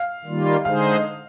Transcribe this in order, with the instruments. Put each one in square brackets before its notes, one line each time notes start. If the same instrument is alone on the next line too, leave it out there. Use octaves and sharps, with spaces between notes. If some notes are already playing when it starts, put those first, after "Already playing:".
Already playing: [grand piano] F5
[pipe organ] D#3 G3 A#3 F4
[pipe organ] D3 G#3 D#4 G#4 C5 [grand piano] F5